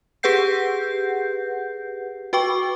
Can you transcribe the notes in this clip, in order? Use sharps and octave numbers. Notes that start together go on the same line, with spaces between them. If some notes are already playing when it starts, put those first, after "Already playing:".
G4 G#4 B4 F#5 G6 C7
F#4 B4 G5 C#6 D6